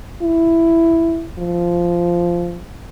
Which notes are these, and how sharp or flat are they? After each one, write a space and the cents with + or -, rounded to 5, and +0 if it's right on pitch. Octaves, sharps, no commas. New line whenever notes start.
E4 +5
F3 -10